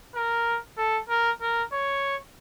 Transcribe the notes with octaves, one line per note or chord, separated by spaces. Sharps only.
A#4
A4
A#4
A#4
C#5